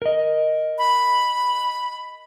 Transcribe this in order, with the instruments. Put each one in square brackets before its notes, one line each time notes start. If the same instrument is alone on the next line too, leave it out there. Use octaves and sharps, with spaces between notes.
[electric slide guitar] A#4 D#5
[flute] B5